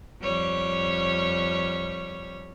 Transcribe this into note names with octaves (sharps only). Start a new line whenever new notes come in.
F2 G3 C#5